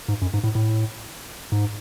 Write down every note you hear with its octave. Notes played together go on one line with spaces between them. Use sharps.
G#2
F#2
G#2
A2
A2
G#2